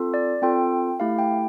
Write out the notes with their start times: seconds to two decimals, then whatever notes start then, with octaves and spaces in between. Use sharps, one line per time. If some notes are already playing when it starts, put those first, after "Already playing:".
Already playing: C4 F4 A4
0.14 D5
0.42 C4 F4 A4 G5
1.00 A3 E4 G4 F5
1.19 G5